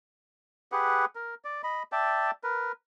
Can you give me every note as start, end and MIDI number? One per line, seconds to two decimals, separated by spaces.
0.72 1.05 67
0.72 1.05 68
0.72 1.05 71
0.72 1.05 78
1.15 1.35 70
1.45 1.62 74
1.64 1.83 75
1.64 1.83 83
1.92 2.31 74
1.92 2.31 76
1.92 2.31 79
1.92 2.31 81
2.44 2.72 70
2.44 2.72 71